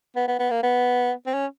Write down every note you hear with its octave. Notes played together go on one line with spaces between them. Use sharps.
B3
B3
B3
A#3
B3
C4
C#4